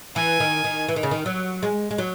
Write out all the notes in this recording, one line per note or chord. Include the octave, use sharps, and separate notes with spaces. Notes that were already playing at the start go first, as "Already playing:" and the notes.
E3 G#5
D#3
D#3
E3
D#3
C#3
D#3
F#3
G#3
G#3
F#3